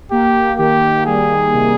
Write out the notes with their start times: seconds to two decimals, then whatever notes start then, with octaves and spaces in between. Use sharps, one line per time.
0.11 A#3 G4
0.58 D#3 G4
1.06 G3 G#4
1.53 C3